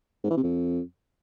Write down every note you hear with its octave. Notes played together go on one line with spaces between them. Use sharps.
G#2
E3
C3
F2